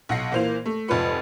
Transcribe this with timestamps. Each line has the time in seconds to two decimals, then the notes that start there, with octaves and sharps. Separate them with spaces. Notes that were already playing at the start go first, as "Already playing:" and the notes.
0.09 B1 F#5 A#6 C7
0.32 A#2 E3 A#3 C5 F5 F7
0.66 A3
0.88 F1 G#2 F4 B4 B5 C#7